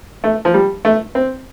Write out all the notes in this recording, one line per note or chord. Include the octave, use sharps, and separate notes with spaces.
A3
F3
G3
A3
C4